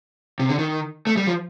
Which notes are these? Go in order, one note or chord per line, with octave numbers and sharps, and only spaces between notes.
C3
D3
D#3
A3
G3
F3